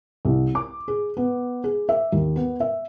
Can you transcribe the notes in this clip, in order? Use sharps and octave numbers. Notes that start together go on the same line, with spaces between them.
C2
D6
G#4
B3
G#4
E5
D#2
B3
E5